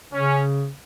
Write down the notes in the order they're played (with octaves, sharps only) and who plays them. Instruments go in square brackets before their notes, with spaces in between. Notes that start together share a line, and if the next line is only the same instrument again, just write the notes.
[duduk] C#3 [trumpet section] C#4